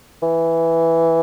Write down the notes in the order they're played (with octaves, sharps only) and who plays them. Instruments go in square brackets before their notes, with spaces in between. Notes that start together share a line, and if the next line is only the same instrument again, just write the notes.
[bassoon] E3